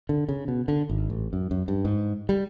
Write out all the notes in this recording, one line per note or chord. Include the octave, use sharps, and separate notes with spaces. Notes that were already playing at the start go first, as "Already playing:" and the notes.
D3
C#3
B2
D3
G#1
A1
F#2
F#2
G2
G#2
G3